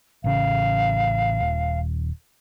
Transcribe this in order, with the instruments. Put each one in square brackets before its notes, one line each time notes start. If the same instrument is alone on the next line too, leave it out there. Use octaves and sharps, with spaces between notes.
[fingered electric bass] A1 C#3 [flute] F5
[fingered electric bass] D#1